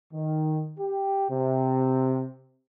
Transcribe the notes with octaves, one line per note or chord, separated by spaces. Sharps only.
D#3
G4
C3